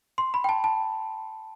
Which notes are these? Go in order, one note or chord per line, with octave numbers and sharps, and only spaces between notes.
C6
B5
G5
A5
A5